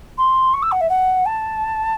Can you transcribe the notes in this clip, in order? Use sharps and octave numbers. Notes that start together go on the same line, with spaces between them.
C6
C#6
E6
F#5
E5
F#5
A5